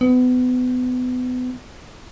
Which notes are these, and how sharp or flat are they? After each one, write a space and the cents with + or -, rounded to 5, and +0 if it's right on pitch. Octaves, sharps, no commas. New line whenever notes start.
B3 +30